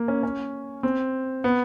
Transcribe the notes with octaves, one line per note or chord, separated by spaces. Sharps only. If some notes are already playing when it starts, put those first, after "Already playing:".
Already playing: A#3
C#4
C#4
C4
B3